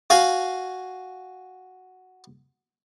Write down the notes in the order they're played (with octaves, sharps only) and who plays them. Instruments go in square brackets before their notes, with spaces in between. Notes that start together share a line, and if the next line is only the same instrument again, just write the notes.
[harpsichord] F#4 F5 G#5